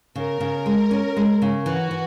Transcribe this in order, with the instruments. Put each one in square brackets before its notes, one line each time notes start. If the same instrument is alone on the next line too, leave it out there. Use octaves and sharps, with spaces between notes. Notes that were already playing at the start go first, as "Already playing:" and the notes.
[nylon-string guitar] C#3 [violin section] A#4
[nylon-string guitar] C#3
G#3
C#4
G#3
C#3
[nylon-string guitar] E3 [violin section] F#4
[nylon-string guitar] E3